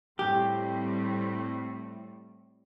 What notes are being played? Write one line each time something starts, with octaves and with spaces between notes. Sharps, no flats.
A2 G3 C4 G4